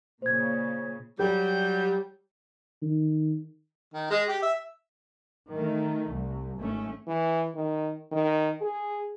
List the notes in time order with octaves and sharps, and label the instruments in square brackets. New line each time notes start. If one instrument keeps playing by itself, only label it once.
[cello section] A#2 C#3 [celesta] C5 G#6
[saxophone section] F#3 G3 [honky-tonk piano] G4 [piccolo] G6
[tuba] D#3
[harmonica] D#3
G#3
G4
E5
[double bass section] D#3 A3
C2
G#1 A3 C#4
[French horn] E3
D#3
D#3
G#4